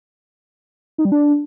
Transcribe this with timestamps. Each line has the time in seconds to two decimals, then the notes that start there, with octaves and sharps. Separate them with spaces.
0.98 D#4
1.05 G3
1.12 D4